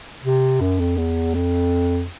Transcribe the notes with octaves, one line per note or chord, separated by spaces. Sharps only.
C3
F#2
F2
E2
F2